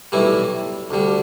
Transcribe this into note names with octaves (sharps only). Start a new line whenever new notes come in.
B1 A2 E3 G3 E4
D2 D3 G3